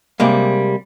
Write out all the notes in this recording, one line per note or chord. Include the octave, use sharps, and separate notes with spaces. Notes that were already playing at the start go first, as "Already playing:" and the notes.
C3 G3 G#3 A#3